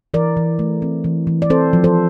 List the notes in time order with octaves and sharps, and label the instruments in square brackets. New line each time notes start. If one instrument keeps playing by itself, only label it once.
[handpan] E3 A#4 D5
E3
A3
C4
E3
E3
D5
C4 A4 C5
F3
A4 C5